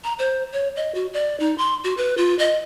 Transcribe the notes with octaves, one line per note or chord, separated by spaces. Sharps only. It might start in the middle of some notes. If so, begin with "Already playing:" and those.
A#5
C5
C#5
D#5
F#4
D5
D#4
C6
F#4
B4
F4
D#5